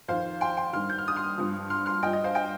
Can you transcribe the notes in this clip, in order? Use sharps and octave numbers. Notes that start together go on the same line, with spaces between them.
F2 D#3 C5 F5
G5 C6
G5 C6
G2 D#3 C6 F6
G6
F6
D#6
C6 F6
G2 F3
C6 F6
C6 F6
G2 F3 D#5 G5
D#5
C5 F5
D#5 G5